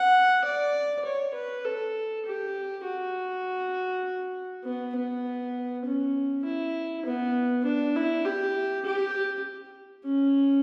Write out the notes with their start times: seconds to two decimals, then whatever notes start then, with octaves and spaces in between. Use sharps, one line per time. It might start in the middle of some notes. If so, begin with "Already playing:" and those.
Already playing: F#5
0.44 D5
1.05 C#5
1.35 B4
1.65 A4
2.26 G4
2.85 F#4
4.65 B3
4.96 B3
5.86 C#4
6.45 E4
7.06 B3
7.65 D4
7.96 E4
8.25 G4
8.85 G4
10.06 C#4